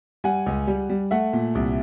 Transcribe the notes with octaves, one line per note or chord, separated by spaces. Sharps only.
G3 F#5 G#5
C#2
G3
G3
A3 E5 F#5
A#2
C2